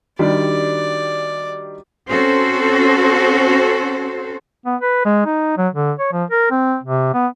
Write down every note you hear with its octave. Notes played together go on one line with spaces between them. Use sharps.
D#3 G3 D4 F#4 G4 D5
C4 C#4 F#4 A4 C5
B3
B4
G#3
D#4
F#3
D3
C#5
F3
A#4
C4
C3
B3